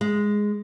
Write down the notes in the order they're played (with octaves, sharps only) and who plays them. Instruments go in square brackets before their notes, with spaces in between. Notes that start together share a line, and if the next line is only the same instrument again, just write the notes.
[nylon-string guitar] G#3